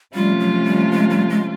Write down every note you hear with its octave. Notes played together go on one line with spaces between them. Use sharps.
C3 F3 G3 A3 C#4 F4
F#3
G3
G#3
G3
G#3